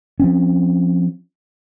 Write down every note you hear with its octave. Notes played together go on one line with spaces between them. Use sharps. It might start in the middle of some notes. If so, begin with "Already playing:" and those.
F3 C4 C#4